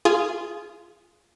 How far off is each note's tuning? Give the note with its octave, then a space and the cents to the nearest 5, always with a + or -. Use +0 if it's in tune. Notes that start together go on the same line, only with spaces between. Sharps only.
F4 -15 G#4 +0